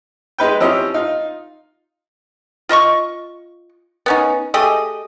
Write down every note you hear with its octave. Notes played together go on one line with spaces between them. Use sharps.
G#3 D#4 B4 G5
F3 C4 C#4 E4 G4 D#5
D#4 F4
F4 D#5 C6 C#6
B3 C#4 D#4
A3 G4 G#4 D#5